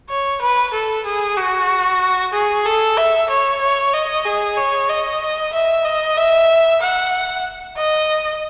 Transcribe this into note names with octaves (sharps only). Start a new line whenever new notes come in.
C#5
B4
A4
G#4
F#4
G#4
A4
E5
C#5
C#5
D#5
G#4
C#5
D#5
E5
D#5
E5
F#5
D#5